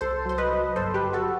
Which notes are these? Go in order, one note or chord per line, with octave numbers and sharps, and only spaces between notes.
C2 A4 C5
F#3 C5
B4 D#5
F#3
G1 A4 C5
G4 B4
G1
F#4 A4